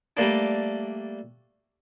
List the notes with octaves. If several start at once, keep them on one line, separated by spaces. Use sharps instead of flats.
G3 A3 A#3 D4